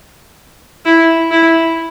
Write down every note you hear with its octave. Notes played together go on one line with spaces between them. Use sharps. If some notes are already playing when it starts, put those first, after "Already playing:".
E4
E4